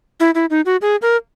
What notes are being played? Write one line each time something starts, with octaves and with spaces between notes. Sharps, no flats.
E4
E4
D#4
F#4
G#4
A#4